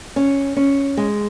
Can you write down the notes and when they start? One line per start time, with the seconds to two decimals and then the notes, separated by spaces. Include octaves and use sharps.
0.16 C#4
0.57 C#4
0.97 G#3